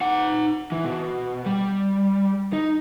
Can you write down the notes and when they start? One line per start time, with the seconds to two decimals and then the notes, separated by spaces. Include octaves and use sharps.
0.01 D#4 F#5
0.72 E3
0.84 B2
1.46 G3
2.53 D#4